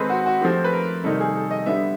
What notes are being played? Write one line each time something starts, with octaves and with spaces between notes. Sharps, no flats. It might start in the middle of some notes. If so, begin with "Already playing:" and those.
Already playing: D#3 G#3 C4 D#4 A4 B4
F#4
F#4
F3 A3 C4 G4
B4
A#4
C3 D#3 G3 A#3 D#4 A4
G#4
A4
D#5
D3 G3 B3 E5